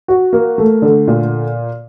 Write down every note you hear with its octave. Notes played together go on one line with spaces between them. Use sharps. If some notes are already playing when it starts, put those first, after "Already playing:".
F#4
A#3
A3
D3
A#2